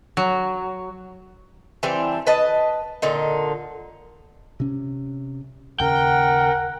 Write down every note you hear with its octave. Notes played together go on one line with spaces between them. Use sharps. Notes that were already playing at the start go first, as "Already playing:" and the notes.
F#3
E3 G3 C4 D4
B4 D#5 A5
A#2 D3 D#4
C3 C#4
D#2 C#3 A#4 F#5 G5